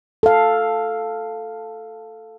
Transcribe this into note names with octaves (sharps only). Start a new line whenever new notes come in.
A4 F5